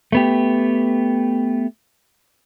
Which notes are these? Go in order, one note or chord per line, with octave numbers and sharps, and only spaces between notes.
A3 B3 G4